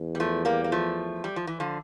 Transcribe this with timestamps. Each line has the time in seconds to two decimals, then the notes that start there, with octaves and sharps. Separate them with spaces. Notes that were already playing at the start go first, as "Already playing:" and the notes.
Already playing: E2
0.15 G3
0.20 F3 A3
0.45 G3 A#3
0.64 A#3
0.72 F3 A3
1.24 G3
1.36 F3
1.47 E3
1.60 D3 F3